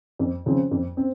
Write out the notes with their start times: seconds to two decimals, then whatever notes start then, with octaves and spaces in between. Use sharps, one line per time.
0.19 F2
0.46 C#3 F3 C4
0.71 F2
0.97 C4